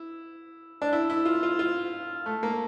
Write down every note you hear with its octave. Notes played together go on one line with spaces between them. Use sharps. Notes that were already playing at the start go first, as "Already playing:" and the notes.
Already playing: E4
D4
E4
E4
F4
F4
F4
A3
A#3